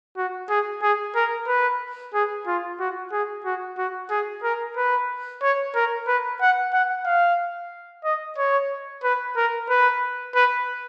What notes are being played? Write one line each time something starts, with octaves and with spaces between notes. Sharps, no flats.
F#4
G#4
G#4
A#4
B4
G#4
F4
F#4
G#4
F#4
F#4
G#4
A#4
B4
C#5
A#4
B4
F#5
F#5
F5
D#5
C#5
B4
A#4
B4
B4